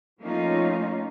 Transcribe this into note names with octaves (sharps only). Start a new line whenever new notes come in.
F3 A3 A#3 C#4 D#4 F4